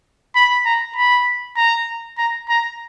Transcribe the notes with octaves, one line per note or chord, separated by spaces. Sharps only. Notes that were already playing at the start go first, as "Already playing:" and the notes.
B5
A#5
B5
A#5
A#5
A#5